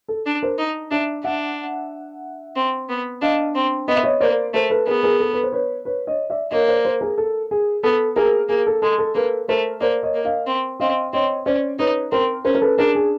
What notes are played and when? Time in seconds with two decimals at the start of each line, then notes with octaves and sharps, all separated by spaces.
0.08 A4
0.26 D4
0.42 A#4 C5
0.58 D#4
0.91 D4 D5 E5
1.24 D4 E5 F#5
2.56 C4
2.89 B3
3.22 D4 D#5 F5
3.55 C4
3.88 B3 D#5
3.96 E5
4.03 C#5 D#5
4.21 A#3 C5 D5
4.54 A3 A#4 C5
4.70 A4 B4
4.87 B3 G#4 A#4
5.03 G#4 A#4
5.20 A4
5.33 B4
5.43 C5
5.52 B4 C#5
5.85 B4 C#5
6.07 C#5 D#5
6.30 D5 E5
6.51 A#3 C#5 D#5
6.68 C5 D5
6.85 A#4 C5
7.01 G#4 A#4
7.18 A4
7.51 G#4
7.83 B3 A4
8.16 A#3 G#4 A#4
8.49 A#3 G#4
8.67 A4
8.82 G#3 A4
8.98 A4
9.15 A#3 A4 B4
9.48 A3 A#4 C5
9.81 A#3 C5 D5
10.03 C#5 D#5
10.14 A#3
10.25 D#5 F5
10.47 C4
10.80 C4 D#5 F5
11.13 C4 C#5 D#5
11.46 C#4 C5 D5
11.79 D#4 B4 C#5
12.12 C4 A#4 C5
12.45 C#4 A#4 C5
12.55 A#4
12.61 A4 B4
12.77 D4 G#4 A#4
12.95 G#4